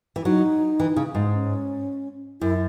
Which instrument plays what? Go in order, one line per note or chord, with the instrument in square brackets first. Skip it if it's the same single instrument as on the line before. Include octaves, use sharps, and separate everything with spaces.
[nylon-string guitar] E3
[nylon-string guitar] F#3 [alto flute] D#4
[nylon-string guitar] E3
C#3
G#2
[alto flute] C#4
[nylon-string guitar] F#2 [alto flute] E4